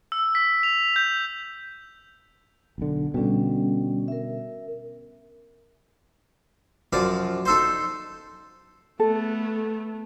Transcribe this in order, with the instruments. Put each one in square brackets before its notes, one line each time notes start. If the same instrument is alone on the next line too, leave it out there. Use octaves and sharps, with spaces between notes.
[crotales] E6
B6
F7
G6
[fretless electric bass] B1 D3
[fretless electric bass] B2 D3 [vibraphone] G3 C#4
[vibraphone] A#4 E5
[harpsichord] F#2 F3 D5
D#4 A4 C5
[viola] A3 B3 [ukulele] A4